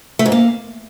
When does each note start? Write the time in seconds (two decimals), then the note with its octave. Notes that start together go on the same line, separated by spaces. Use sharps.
0.19 A3
0.26 G#2
0.32 A#3